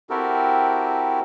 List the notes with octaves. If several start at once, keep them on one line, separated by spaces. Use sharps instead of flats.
C4 E4 F#4 G4 A4 A#4